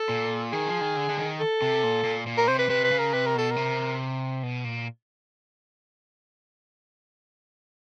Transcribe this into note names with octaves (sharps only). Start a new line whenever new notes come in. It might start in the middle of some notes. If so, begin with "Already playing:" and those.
Already playing: A4
A#2
D#3 G#4
F3
D#3
D3
D3
D#3
A4
C3
A#2
A#2
A#2
A#4
C3 C5
B4
C3 B4
B4
C#3
A#4
C3 B4
A#4
B2 A4
A#4
C3
B2
A#2